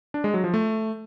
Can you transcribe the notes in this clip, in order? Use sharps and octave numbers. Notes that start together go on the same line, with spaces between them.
D4
G#3
F#3
F3
A3